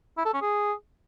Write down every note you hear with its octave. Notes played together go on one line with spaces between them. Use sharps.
E4
A4
C#4
G#4